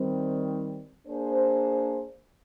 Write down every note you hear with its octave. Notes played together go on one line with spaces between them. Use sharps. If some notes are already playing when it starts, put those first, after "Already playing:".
Already playing: D#3 G3 C4
A#3 D4 G#4 C5